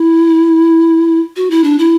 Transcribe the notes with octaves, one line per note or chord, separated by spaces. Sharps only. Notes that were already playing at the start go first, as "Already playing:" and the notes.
Already playing: E4
F#4
E4
D4
E4